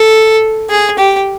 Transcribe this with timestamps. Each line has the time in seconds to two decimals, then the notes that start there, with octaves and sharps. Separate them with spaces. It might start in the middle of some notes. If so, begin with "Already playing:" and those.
Already playing: A4
0.70 G#4
0.98 G4